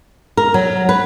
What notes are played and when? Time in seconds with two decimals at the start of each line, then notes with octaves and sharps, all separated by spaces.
0.37 A#4
0.54 F#3
0.89 B4